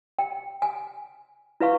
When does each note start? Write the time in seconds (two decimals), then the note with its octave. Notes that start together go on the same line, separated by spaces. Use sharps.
0.19 G5
0.62 G#5
1.60 E4 B4 F5 C#6